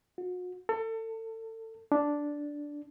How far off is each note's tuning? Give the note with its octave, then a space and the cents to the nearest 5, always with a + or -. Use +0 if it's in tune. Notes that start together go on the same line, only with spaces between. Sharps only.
F#4 -40
A4 +30
D4 -5